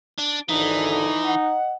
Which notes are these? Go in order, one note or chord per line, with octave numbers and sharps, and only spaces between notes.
D4
G#1 D3 E3 D#4
D#4
D#5 F#5